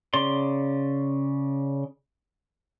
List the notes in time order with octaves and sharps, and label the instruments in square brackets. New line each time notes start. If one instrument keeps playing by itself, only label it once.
[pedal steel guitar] C#3 D5 C6